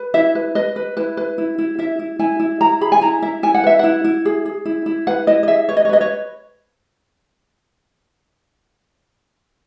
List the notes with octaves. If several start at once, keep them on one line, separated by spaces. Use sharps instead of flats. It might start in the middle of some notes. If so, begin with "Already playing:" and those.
Already playing: B4
E4 E5
B4
B4 D#5
B4
E4 B4
B4
E4
E4
E4 E5
E4
E4 G#5
E4
E4 A#5
G#4 B5
G#5
E4 A#5
E4 E5
E4 G#5
F#5
B4 E5
E4 F#5
E4
G#4
G#4
E4
E4
B4 F#5
E4 D#5
D#5
G#4 E5
B4 C#5
D#5
C#5
B4 D#5
C#5